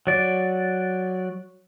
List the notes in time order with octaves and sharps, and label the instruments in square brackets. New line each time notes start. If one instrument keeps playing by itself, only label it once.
[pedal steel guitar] F#3 D5